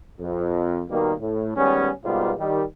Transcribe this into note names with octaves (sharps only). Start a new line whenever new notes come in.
F2
B2 D#3 G3 A#3
A2
D#3 G3 G#3 B3 C#4
G#2 B2 G3 A#3 B3 F4
D#3 G3